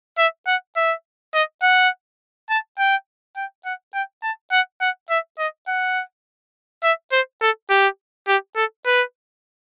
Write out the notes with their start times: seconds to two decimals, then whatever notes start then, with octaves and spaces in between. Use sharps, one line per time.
0.18 E5
0.47 F#5
0.76 E5
1.34 D#5
1.63 F#5
2.50 A5
2.79 G5
3.37 G5
3.65 F#5
3.94 G5
4.23 A5
4.52 F#5
4.81 F#5
5.10 E5
5.39 D#5
5.68 F#5
6.83 E5
7.12 C5
7.42 A4
7.70 G4
8.28 G4
8.56 A4
8.86 B4